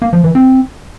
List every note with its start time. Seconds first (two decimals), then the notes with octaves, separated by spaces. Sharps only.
0.02 A#3
0.13 F3
0.24 E3
0.35 C4